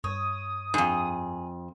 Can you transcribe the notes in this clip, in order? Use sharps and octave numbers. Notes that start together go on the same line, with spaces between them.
G2 C#5 D#6
F2 G#2 G#4